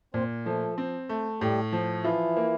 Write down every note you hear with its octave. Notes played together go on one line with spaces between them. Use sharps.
A#2 C4 C5
F3 A3 A4
C4
A3
A2 G3 G4
F3
E3 E4 F4
A#3